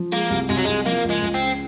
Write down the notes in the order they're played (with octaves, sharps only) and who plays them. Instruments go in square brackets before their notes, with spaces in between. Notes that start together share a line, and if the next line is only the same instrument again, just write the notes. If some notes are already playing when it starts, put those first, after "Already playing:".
Already playing: [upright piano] F3
[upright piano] G#3 [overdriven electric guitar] A#3
[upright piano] C2
[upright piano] C2 [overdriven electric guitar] G#3
[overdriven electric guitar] F#3
[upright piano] C2 [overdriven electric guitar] G#3
[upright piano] F3 [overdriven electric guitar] A#3
[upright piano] C#2
[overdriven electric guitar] G#3
[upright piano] C#2
[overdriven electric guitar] C4
[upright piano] C#3